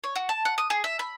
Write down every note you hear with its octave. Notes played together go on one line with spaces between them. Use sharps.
C#5
F#4
A5
F#5
D#6
G#4
E5
B5